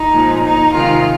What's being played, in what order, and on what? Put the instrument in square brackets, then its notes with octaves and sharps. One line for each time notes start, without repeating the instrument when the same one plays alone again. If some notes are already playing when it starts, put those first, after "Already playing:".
Already playing: [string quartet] D#4
A#2 F3 G#3
D#4
C3 D#3 G#3 F4